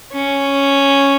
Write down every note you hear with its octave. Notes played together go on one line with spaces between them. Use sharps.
C#4